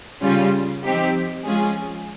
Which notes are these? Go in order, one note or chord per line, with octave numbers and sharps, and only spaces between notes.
C#3 G3 C#4 F4
F3 C4 D#4 G4
F3 G#3 C#4 F4 G#4